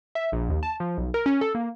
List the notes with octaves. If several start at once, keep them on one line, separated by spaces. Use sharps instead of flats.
E5
A#1
D#2
A5
F3
B1
A#4
C#4
A4
A#3